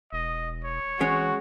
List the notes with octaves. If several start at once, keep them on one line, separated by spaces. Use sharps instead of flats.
E1 D#5
C#5
E3 G#3 C#4 F#4